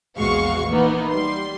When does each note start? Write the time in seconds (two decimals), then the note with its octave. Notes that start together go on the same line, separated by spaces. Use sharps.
0.18 A#1 E2 G#3 F#4 F5 C#6
0.70 E3 A#3 B3 D#4
1.11 G3 C6